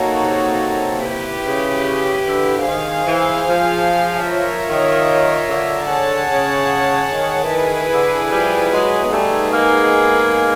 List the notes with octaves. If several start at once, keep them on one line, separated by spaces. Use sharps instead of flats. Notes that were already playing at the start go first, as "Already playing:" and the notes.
Already playing: A#3 D#4 F#4 A4 C#5
C3
E4 G4 B4
C#3
D3
D#3 G#4 C5 F5
E3
F3
F4 A#4 C#5 E5
D#3
D3
G#4 C#5 F#5 A5
C#3
D#3
E4 G#4 B4
D3
F3 G3
F#3 G#3
G3 A3 B3 D#4 G#4
G#3 A#3